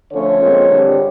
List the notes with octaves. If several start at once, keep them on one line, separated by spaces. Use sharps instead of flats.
D3 F3 A3 C#4 C#5
A#2 F3 G#3 C4
G2 D3 G3 C4